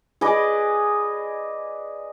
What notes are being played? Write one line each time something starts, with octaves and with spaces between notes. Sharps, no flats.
G#4 B4 D5 D#5